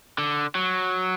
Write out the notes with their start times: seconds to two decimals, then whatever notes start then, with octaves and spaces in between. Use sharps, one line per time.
0.18 D3
0.55 F#3